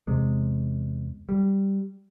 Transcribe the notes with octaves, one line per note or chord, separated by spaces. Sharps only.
E2 C3 G#3
G3